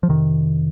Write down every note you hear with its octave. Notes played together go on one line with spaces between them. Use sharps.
F3
F2 C3 D#3